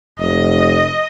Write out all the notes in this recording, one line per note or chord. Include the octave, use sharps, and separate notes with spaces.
F1 D#5